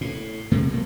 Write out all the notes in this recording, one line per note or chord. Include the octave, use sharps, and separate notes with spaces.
A2
C3 G#3 A3
B1 B2 D#3 A#3